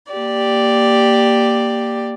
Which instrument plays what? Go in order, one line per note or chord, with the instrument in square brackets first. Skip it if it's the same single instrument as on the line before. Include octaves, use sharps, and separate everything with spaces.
[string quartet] A#3 G4 D5